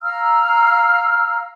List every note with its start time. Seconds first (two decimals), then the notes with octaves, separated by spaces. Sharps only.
0.02 F5 A#5 E6 F6